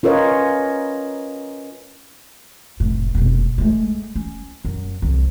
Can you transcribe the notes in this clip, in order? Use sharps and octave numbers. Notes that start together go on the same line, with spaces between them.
C#4 F4 A#4 B4 C#5 D#5
F1 A2
F1 B2
G#3 A3
C#4
F#2
C2 F2